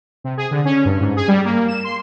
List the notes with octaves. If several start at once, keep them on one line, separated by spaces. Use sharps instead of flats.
C3
G#4
D3
C#4
G2
G#2
G#4
G3
A#3
E7
C6